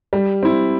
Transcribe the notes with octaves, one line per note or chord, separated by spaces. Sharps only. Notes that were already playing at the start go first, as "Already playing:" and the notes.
G3
C4 E4